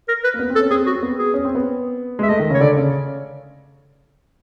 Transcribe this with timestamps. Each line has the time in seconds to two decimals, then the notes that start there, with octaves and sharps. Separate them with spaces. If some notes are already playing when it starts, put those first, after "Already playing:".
0.08 A#4
0.24 B4
0.34 A#3
0.39 B3
0.50 C4
0.55 A4
0.61 C#4
0.70 C4 G#4
0.86 F#4
0.95 C4
1.03 B3
1.18 G#4
1.34 C#4
1.45 C4
1.55 B3
2.19 G#3 E5
2.29 A3 D#5
2.39 D#3
2.50 C#3 C#5
2.60 D3 D5
2.76 C#3